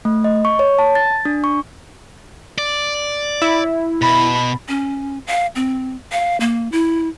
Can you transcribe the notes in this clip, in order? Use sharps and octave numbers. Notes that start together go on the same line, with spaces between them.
A3
D#5
C#6
C#5
A5
A6
D4
C#6
D5
E4
B2 B5
C#4
F5
C4
F5
A#3
E4